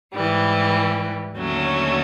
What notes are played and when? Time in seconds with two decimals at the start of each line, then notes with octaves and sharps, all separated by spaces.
0.14 G#2 E3 G3
1.36 D#2 D3 F#3 A3 C#4